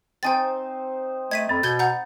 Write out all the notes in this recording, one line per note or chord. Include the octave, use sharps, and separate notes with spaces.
C4 D#4 C5 G5 G#5 A6
A3 D#5 G#6 B6 D#7
F2 B5 A6
B2 G6 G#6 G7
F#5 A#5 G6